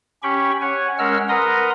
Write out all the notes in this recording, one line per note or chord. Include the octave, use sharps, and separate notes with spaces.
C#4 G4 G5 B5 C#6
C#5 F#5 G#5
G#3 C#4 A#4 F#5 E6 F6
A#4 B4 F#5 A#5 C6 D#6